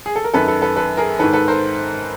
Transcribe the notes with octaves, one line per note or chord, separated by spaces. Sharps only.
G#4
A4
A#4
F#2 D#3 A4 B4
A4 B4
A4 B4
A4 B4
G#4 A#4
G#2 D#3 A4 B4
A4 B4
A#4 C5